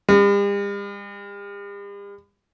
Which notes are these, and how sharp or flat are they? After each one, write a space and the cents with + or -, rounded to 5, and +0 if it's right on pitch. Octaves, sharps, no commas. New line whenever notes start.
G3 +45